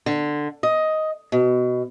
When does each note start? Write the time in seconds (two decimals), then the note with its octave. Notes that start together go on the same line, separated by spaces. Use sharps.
0.06 D3
0.63 D#5
1.32 B2